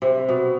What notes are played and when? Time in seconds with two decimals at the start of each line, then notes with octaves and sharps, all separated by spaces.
0.02 C3
0.29 B2